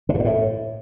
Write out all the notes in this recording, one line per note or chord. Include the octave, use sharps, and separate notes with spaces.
D3
G2
A#2
A2